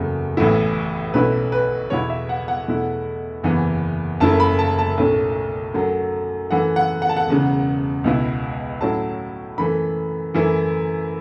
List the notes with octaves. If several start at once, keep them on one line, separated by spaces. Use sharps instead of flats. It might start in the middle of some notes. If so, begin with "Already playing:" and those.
Already playing: F#1 E2 C#3 F#3 A3
A1 A2 E3 B3 E4
B1 B2 A3 C#4 E4 B4
B4
E2 B2 B3 E4 C#5
E5
F#5
F#5
E2 B2 A3 E4
F#1 E2 E3 B3
F#1 F#2 C#3 A3 E4 A5
B5
A5
A5
B1 A2 A3 C#4
F#2 F#3 A3
F#2 E3 A3 F#5
F#5
F#5
A5
F#5
E1 E2 C#3
C#2 B2 B3 E4
A2 F#3 C#4 E4 A5
F#2 E3 A3 B5
F#2 E3 A3 E4